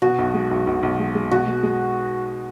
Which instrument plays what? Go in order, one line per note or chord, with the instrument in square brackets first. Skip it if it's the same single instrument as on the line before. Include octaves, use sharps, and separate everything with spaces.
[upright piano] B2 [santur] F#4
[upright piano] B1
G#3
B1
B1
B1
G#3
G#3
[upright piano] B2 [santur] F#4
[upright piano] G#3
G#3